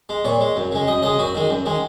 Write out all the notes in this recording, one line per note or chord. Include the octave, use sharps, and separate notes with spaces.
G#3
A#2 C#5
G#3
F#2
C#3 G#3
F#2 D#5
C#3 G#3 D#5
F#2 F#4
D#3 G#3
F#2
D#3 G#3